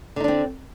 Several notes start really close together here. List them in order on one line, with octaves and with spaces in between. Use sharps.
D3 D#4 D4 C4